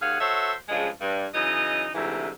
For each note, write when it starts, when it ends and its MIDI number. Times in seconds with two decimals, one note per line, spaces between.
0.01 0.19 39
0.01 0.19 68
0.01 0.19 73
0.01 0.19 77
0.01 0.19 78
0.19 0.54 66
0.19 0.54 69
0.19 0.54 72
0.19 0.54 73
0.19 0.54 76
0.68 0.88 43
0.68 0.88 49
0.68 0.88 53
0.68 0.88 56
1.00 1.26 43
1.34 1.88 49
1.34 1.88 52
1.34 1.88 54
1.34 1.88 63
1.34 1.88 75
1.94 2.29 38
1.94 2.29 44
1.94 2.29 48
1.94 2.29 52